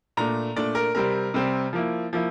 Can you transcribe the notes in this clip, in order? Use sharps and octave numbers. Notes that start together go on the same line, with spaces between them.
A#2 A3 D4 A#5
A#2 A3 D4 D5
A#4
C3 G3 C4 A#4
C3 G3 C4
F3 A#3 E4
F3 A#3 E4